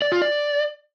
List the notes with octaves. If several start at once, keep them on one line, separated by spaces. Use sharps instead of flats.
D5
F4
D5